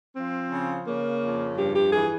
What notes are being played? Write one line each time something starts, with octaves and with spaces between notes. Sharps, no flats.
F3 C4
C#3
C#3 A#3
F2
G2 G4
G4
E3 G#4